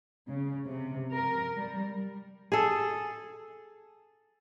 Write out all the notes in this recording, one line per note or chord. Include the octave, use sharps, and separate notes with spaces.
C#3
C3
A#4
G3
G#4 A4